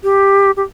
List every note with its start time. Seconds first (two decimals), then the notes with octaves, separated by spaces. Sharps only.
0.03 G4
0.57 G4